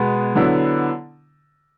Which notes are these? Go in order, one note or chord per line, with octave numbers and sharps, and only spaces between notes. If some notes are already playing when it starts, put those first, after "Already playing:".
Already playing: B2 G#3 B3
D3 F#3 B3 E4